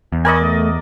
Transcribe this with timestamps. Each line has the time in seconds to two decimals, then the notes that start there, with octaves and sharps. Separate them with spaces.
0.12 E2
0.25 A#4 D5 D#5 G#5 B5 C#6
0.41 A3